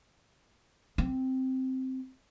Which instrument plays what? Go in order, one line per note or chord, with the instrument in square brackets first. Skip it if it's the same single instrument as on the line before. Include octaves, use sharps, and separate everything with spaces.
[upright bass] C4